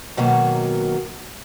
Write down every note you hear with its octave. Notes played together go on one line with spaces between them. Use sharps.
B2 D#3 F#3 A#3